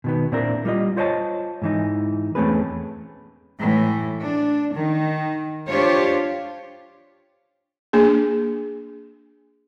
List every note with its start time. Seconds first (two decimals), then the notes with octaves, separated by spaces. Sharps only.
0.04 B2 D#3 B3
0.32 A#2 C4 D4 E4 A#4
0.65 G3 F4 D#5
0.96 F4 C5 C#5 D#5 A5
1.62 G#2 E3 D#4
2.35 E2 A3 C4 C#4 G#4 B4
3.58 A2 E3
4.22 D4
4.74 D#3
5.67 D4 F4 G4 C5 C#5
7.93 A#3 D4 G#4